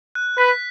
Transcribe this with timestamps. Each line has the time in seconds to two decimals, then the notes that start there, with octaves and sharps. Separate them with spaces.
0.15 F#6
0.37 B4 B6